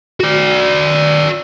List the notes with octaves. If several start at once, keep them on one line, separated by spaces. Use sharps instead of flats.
F#4 D5